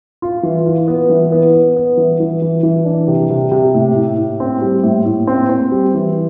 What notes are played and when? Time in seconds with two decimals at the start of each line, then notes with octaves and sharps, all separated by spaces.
0.22 F4
0.43 E3
0.66 F4
0.88 B3
1.10 E3
1.32 B3
1.53 B3
1.76 B3
1.97 E3
2.20 E3
2.42 E3
2.63 E3
2.85 D4
3.08 C3
3.30 C3
3.52 C3
3.74 A2
3.95 A2
4.17 A2
4.40 C4
4.62 G3
4.83 A2
5.05 A2
5.27 C4
5.49 C4
5.72 G3
5.94 E3